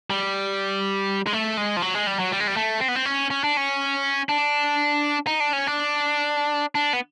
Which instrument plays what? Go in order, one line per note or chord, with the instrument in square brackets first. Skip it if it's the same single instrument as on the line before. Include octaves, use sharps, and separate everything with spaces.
[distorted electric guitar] G3
G#3
A3
G#3
F3
F#3
G#3
G3
F#3
G3
G#3
G3
A3
C4
B3
C4
C#4
C#4
D4
C#4
D4
D#4
D4
C#4
D4
D4
B3